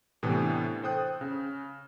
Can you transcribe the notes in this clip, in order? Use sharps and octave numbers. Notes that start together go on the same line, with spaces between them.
A2 C3 E3 B3 D4
A4 C5 G5 D#6 F#6
C#3